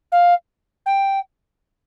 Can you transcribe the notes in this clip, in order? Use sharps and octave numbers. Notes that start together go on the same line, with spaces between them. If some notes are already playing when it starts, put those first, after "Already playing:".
F5
G5